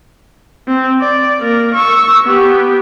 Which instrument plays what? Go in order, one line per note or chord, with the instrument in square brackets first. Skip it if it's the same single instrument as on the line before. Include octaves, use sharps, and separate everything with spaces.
[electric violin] C4
D5
A#3 A#4
C#6 E6
B3 G4